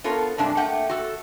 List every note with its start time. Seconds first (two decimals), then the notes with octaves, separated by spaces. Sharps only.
0.04 B3 F4 A4 A#4 C#5
0.38 G2 C3 G#3 D4 A5
0.57 A3 A#3 F#5 G5
0.89 F#4 A4